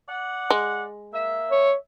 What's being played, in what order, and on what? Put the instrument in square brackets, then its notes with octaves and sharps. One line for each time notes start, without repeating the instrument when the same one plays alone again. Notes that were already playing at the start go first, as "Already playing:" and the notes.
[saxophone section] D5 F#5
[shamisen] G#3
[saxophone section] A#3 E5
[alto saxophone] C#5